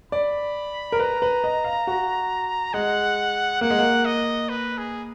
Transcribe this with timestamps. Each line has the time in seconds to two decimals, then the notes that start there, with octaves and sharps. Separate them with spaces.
0.12 D5 B5
0.92 A#4
0.99 B4 A#5
1.22 B4
1.44 D#5
1.64 F5
1.87 F#4
2.74 G#3 F#5
3.61 A#3 F#5
3.70 G#3
3.79 A#3
4.05 D#5
4.49 B4
4.78 G#4